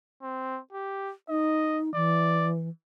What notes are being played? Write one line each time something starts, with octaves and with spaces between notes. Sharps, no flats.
C4
G4
D#4 D#5
E3 D5